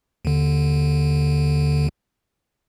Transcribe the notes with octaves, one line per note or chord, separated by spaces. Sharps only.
D#2 D3